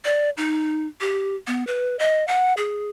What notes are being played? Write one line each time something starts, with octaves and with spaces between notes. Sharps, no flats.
D5
D#4
G4
B3
B4
D#5
F#5
G#4